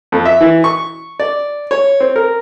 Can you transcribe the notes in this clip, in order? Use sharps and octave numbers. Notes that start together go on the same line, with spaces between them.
F2
E5
E3
C#6
D5
C#5
C4
A#4